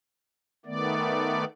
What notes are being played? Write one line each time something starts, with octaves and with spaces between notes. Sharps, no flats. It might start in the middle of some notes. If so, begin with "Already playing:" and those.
D#3 A3 B3 D5